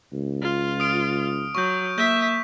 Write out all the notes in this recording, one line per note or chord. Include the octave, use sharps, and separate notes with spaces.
C#2
F4
D#6 F6 D7
F#3 C#6 G6
A#3 E5 G6 B6